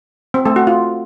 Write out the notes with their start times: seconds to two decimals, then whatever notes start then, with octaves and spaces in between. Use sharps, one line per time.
0.34 C4
0.45 A3 A4
0.56 F#4
0.67 F4